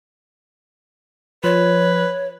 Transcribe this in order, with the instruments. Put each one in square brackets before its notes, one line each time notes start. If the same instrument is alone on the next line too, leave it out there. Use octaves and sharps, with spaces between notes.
[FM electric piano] F3 [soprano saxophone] B4 [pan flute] C#5